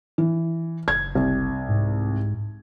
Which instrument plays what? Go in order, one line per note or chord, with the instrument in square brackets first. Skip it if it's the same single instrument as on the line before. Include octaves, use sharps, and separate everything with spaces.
[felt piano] E3
[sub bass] F#1 [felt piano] G#6
[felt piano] C2
[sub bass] G#2